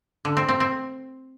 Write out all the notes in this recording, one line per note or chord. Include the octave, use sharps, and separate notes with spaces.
D3
C4
C4
C4